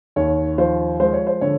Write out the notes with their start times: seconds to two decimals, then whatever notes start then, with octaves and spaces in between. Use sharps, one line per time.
0.16 D#2 C#5
0.58 F3 C5
1.00 G#3 C5
1.13 C#5
1.27 C5
1.41 D3 C#5